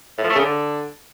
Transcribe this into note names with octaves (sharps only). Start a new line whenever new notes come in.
A2
F3
A3
C#3
D3